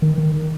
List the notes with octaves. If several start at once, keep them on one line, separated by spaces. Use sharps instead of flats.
D#3
D#3